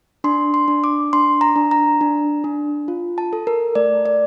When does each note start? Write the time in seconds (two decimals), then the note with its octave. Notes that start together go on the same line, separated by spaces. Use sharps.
0.24 D4 C6
0.54 C6
0.68 D4
0.84 D6
1.13 D4 C6
1.41 A#5
1.56 D4
1.71 A#5
2.01 D4
2.44 D4
2.88 F4
3.18 A5
3.33 A4
3.47 A#4
3.75 A3 D5
4.06 D5